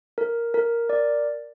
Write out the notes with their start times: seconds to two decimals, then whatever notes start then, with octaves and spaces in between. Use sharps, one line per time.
0.18 A#4
0.54 A#4
0.89 D5